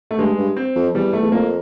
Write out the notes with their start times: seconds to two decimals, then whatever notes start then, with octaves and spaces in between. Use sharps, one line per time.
0.11 A3
0.18 G2 G#3
0.37 G2
0.57 C4
0.75 F2
0.94 E2 G3
1.13 A3
1.22 E2
1.32 F2 A#3